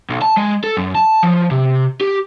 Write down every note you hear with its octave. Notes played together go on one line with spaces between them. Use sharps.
B1
A5
G#3
A4
F#2
A5
F3
C3
G4